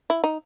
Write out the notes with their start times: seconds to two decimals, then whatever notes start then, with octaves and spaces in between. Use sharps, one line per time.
0.10 E4
0.24 D#4